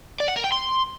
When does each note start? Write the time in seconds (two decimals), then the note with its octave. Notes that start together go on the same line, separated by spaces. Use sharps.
0.20 D5
0.28 F#5
0.36 A#4
0.44 G5
0.52 C6